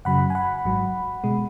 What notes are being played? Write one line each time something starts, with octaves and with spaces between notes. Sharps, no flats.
F#2 C#3 F#3 F#5 B5
G#5
F#5 B5
G#1 G#2 F#3
B2 G#3